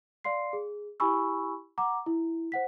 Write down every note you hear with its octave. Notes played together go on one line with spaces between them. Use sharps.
D5 F5 C6 C7
G#4
E4 G4 G#5 B5 C#6 E6
F#5 A#5 D6
E4
C5 F#5 B6